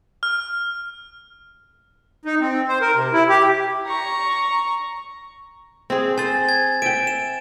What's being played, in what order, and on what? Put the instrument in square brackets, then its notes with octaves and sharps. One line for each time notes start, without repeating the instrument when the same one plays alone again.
[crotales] F6
[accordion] D#4
C4
C5
A#4
C3
E4
G4
[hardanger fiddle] A#5 C#6
[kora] C4 G#4
[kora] C5 [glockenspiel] G#5 A6
[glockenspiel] G#6
[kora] E5 G5 [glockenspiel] D7
[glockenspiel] E7